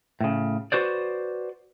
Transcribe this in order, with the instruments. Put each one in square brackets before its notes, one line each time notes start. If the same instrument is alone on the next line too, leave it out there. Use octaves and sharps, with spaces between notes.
[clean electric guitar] A2 C#3
F#4 B4 C5 D5